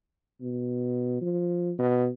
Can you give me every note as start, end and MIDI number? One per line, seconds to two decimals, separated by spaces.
0.41 1.21 47
1.21 1.73 53
1.79 2.08 47